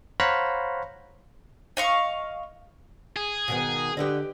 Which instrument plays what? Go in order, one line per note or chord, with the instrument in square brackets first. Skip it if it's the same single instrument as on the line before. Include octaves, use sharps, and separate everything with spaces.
[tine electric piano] C5 C#5 F5 F#5 A#5 B5
[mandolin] D#5 F5 C#6
[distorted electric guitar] G#4
[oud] B2 D#3 B3
[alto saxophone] D3 [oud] G4 B4 D#5